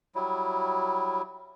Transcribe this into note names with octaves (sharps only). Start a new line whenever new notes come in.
F#3 G3 E4